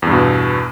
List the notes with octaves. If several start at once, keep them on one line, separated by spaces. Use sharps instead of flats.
E2 G2 B2